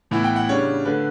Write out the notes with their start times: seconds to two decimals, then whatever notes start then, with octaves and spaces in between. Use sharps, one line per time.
0.11 A2 E3 B3 E4
0.24 G5
0.36 F#5
0.49 C#3 G3 D4 C#5
0.85 D3 A3 D4 B4